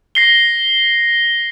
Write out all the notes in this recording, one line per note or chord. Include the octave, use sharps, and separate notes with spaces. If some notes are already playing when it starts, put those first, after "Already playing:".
A#6 C7 G7